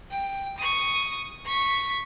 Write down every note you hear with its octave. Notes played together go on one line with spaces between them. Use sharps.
G5
C#6 D#6
C#6 B6